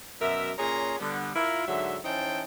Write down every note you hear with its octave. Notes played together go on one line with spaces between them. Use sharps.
F#2 B2 A#4 E5
A#2 C#4 G#4 C#5 A#5 C6
D3 G3 B3
E4 F4 A#4
G#2 D3 F#3 E5
E3 C#4 D#4 C5 G5 A5